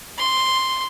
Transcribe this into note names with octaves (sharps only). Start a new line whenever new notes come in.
C6